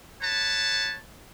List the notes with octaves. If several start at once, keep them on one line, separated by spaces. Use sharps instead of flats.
B4 C#5 A5